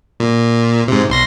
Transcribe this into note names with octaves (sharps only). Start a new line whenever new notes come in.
A#2
G#2 C3
B1 C6 A#6